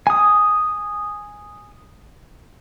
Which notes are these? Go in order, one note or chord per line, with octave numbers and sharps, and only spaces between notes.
G#5 D#6